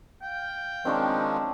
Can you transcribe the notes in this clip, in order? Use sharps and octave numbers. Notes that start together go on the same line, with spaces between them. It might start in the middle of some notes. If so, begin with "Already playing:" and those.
F5 G5
D#3 F3 G#3 C4 D4 C#5